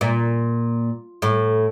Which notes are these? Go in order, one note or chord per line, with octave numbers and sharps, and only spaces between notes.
A#2
A2